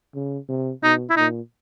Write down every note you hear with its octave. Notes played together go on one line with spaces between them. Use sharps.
C#3
C3
B2 D#4
E4
A#2 D#4